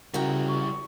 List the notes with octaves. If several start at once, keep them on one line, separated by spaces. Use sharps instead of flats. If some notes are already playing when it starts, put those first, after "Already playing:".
C#3 G3 E4 F#4 A#4 G5
C#6